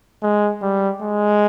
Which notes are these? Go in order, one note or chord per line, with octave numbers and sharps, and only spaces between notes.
G#3
G3
G#3